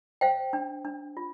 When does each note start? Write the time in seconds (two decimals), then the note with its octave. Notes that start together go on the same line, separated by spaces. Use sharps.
0.21 C5 F5 G5
0.53 D4
0.85 D4
1.17 F4